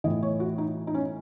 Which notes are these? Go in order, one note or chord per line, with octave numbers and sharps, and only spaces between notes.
A2 E3 D#5
C#5
F#4
D#4
D#4
C#4